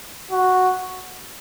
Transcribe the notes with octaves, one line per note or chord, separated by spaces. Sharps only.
F#4